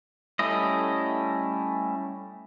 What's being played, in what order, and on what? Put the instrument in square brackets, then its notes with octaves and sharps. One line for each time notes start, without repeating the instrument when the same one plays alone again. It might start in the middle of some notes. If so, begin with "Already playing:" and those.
[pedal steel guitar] G3 A3 C#4 E4 D#5